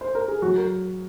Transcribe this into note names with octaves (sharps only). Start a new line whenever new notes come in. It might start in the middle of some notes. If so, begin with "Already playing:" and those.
C5
A#4
G#4
F#3 F#4
A#4